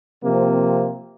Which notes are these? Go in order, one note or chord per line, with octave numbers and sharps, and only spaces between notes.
C3 F3 A#3 C4